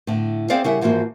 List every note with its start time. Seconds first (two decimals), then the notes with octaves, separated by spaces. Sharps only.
0.07 A2 D3
0.50 C4 G#4 C5 D5 F5 F#5
0.64 C#3 G3 E4 A#4 E5 F#5
0.81 G#2 E3 F3 A#3 F#4